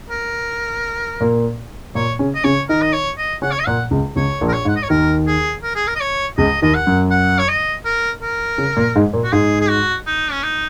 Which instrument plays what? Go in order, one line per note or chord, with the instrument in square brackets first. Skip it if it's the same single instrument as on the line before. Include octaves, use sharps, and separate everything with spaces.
[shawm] A#4
[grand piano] A#2 A#3
[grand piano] A#2 A#3 [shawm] C#5
[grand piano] C#3 C#4
[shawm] D#5
[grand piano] C#3 C#4 [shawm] C#5
[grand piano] D#3 D#4 [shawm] A#4
[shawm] D#5
C#5
D#5
[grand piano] C#3 C#4 [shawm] F#5
[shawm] C#5
D#5
[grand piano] A#2 A#3 [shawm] F#5
[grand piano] C#2 C#3
[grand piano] C#2 C#3 [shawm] C#5
[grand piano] A#1 A#2
[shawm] A#4
C#5
[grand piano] G#2
[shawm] F#5
D#5
C#5
[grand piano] D#2 D#3 [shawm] A#4
[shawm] G#4
A#4
G#4
A#4
D#5
C#5
[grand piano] C#2 C#3 [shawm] D#5
[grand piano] D#2 D#3 [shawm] D#5
[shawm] F#5
[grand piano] F#2 F#3
[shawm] F#5
C#5
D#5
A#4
A#4
[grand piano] C#3 C#4
A#2 A#3
G#2 G#3
A#2 A#3
[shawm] F#4
[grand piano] G#2 G#3 [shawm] G#4
[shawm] G#4
F#4
D#4
C#4
D#4